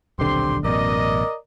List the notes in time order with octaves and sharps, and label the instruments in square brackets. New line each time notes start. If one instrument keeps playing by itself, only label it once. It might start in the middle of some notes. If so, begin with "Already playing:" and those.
[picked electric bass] D#1 B1 D3 [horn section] C4 G4 C6
[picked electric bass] A1 F#2 B2 [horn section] A#4 D5 D#5